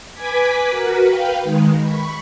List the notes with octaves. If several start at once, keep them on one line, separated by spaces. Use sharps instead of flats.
B4 G#5 D6 G#6 B6
F#4 A#4 B4
B4 F5 G5
D#3 G#3
B5 C#6